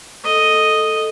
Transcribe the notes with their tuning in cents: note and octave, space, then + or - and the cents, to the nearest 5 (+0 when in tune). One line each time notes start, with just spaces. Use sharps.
A4 +0 D#5 +0